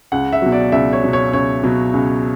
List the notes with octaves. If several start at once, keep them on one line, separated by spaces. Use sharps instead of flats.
C#2 F#5
E5
B2 F#3
D5
C#2 E5
C#5
B2 F#3
C#5
C#2 C#5
B2 F#3
C#2